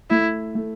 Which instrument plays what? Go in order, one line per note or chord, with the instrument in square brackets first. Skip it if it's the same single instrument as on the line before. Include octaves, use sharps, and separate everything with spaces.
[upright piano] A3 [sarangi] E4
[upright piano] A3